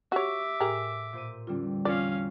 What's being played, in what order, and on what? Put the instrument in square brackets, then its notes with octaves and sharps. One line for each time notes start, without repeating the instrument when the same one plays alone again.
[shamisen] F#4 C#5 [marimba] G4 [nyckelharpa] E5 D6
[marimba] A2 [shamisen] G4 G#4 A#4
[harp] A#2 C5 D#7
[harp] E2 D3 G3 [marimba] C#4 F4
[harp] E2 C4 [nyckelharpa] C#4 F5 [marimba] F4 [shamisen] D5